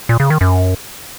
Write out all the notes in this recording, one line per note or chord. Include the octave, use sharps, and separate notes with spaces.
A#2
C#3
D#3
F#2